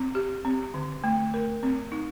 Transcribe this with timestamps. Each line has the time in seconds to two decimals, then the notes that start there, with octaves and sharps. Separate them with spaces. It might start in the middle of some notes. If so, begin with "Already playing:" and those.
Already playing: C4
0.15 G4
0.45 C4
0.74 D3
1.04 A3
1.34 A#4
1.63 C4
1.92 D#4